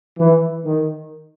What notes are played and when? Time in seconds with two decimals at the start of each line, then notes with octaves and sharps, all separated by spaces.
0.19 E3
0.65 D#3